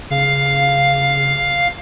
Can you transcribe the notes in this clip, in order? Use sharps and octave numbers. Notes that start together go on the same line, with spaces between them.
C#3 F5